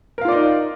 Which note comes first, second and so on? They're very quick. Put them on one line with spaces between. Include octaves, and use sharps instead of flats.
A#4 F5 F4 D5 D#4